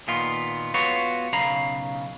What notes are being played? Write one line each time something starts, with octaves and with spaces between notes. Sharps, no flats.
A#2 D#3 B3 F4
B3 F4 F#4 B4 C#5
B1 C#3 F5 A#5 B5